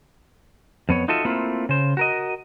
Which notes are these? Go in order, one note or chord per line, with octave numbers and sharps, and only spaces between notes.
F2 B3 C#5
D#4 F4 F#4 A4 D#5 E5
A3 A#3 C4 E4 F4
C#3 C5
F#4 A#4 D#5